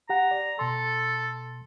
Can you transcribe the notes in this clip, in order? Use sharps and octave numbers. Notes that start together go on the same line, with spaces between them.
G4 F#5 A#5
D5
B2 A4 A5 C6